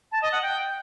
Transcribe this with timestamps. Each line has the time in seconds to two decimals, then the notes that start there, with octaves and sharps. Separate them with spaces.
0.12 A5
0.22 D#5
0.32 F#5
0.42 G5